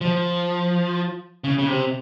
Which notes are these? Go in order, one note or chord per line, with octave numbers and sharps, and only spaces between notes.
F3
C#3
C#3
C3